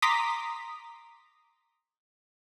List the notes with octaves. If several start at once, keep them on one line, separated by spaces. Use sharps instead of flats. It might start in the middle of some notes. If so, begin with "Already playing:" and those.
A#5 C6 D6 D#6 B6